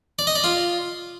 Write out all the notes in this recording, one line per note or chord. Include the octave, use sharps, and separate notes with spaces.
D5
D#5
D5
F4